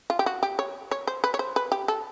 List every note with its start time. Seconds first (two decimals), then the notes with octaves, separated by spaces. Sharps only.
0.10 F4
0.19 G4
0.26 F#4
0.43 G4
0.59 C#5
0.91 C#5
1.07 C5
1.24 B4
1.34 C#5
1.39 C5
1.56 B4
1.72 G4
1.88 A4